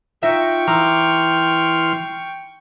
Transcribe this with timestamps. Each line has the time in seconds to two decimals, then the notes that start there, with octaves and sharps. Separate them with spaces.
0.23 D#4 F4 E5 G5 C#6 A#6
0.67 E3 A#5 C6 D6 E6 F6